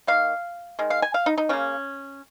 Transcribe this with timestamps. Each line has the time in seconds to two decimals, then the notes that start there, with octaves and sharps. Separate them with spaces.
0.07 D#3 A#3 F5
0.79 D#3 G#3
0.90 F5
1.02 G#5
1.14 F5
1.26 D#4
1.38 D#4
1.49 C#3 A#3 C#4